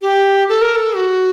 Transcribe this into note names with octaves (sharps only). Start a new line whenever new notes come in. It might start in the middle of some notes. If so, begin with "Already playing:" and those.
G4
A4
A#4
A4
F#4